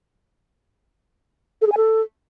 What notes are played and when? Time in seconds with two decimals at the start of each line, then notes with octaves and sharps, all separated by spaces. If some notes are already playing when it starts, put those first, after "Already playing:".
1.62 A4
1.67 G#4
1.72 G#5
1.77 A4